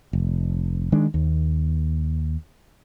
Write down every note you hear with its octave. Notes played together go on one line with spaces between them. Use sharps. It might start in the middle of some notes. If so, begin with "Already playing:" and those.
F1
D#3 G#3 D4
D#2